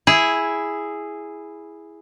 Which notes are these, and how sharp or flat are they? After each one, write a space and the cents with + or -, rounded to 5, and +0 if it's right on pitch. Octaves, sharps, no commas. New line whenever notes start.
E4 +0 G#4 +0